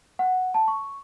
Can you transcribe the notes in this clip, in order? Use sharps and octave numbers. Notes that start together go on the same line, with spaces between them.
F#5
A5
C#6